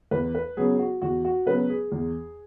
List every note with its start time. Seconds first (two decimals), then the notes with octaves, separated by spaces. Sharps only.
0.11 E2 B4
0.35 B4
0.57 C#3 F#3 B3 G#4
0.79 F#4
1.02 E2 F#4
1.25 F#4
1.46 C#3 F#3 B3 B4
1.69 G#4
1.92 E2